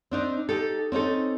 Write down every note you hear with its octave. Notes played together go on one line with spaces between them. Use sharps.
C4 D4 D#4
D#4 G4 A4
C4 C#4 D#4 A4